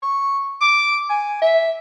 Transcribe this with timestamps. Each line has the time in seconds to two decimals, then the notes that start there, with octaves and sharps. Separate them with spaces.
0.02 C#6
0.61 D6
1.09 G#5
1.42 E5